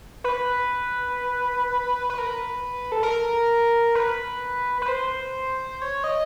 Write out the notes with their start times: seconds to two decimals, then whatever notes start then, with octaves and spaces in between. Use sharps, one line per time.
0.24 B4
2.09 B4
2.18 A#4
2.27 B4
2.92 A4
3.03 A#4
3.95 B4
4.82 B4
4.88 C5
5.82 C#5
6.04 D#5